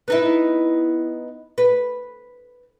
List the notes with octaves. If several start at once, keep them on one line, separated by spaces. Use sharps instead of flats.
B3 D#4 E4
B4